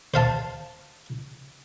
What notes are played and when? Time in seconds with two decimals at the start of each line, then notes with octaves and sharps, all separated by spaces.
0.14 C5 F5 A5